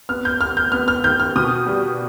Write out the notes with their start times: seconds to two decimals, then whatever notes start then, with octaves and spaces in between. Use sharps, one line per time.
0.09 B3 F6
0.25 G6
0.40 B3 F6
0.57 G6
0.72 B3 F6
0.88 F6
1.03 D#3 G6
1.20 F6
1.36 B2 D#6
1.67 G3